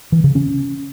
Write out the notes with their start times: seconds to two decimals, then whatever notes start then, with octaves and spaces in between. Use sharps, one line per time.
0.12 E3
0.24 C#3
0.35 C#4